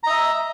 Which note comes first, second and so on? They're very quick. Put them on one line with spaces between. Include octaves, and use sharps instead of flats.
A#5 D#5 E5